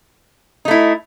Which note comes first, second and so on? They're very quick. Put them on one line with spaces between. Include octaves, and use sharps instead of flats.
D#4 A3 E4